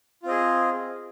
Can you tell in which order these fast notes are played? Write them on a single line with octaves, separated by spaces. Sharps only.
F4 C4 D#5 G#4